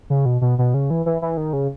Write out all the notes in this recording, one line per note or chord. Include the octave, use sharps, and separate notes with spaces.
C#3
B2
B2
B2
C#3
E3
E3
E3
D#3
C#3